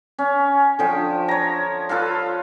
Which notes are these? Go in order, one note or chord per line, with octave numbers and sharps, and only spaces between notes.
C#4
D3 F3 G5
C#5 A#5
F4 A4 B4 F5